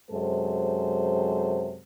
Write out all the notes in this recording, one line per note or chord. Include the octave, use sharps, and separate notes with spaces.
F#2 C3 G#3 A4 C5